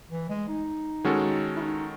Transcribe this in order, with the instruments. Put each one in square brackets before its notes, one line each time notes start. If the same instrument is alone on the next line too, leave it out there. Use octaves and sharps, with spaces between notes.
[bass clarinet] E3
G#3
D#4
[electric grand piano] D#3 G#3 C#4 F#4 A4
[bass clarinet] E4
D#4